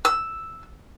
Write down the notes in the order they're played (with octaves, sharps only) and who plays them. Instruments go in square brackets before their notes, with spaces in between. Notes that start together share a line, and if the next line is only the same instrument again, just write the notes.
[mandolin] E6